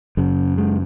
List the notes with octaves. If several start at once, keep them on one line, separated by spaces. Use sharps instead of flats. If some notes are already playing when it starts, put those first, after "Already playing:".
F#1 F#2 C#3
G#3